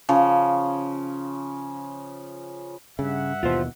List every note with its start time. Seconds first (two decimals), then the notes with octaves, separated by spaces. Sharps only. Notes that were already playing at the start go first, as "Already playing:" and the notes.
0.09 C#3 F3
2.99 G2 C#3 E5 F#5
3.43 D#2 B2 E3 F4 C5